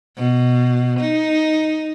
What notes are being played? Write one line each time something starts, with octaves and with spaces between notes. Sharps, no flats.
B2
D#4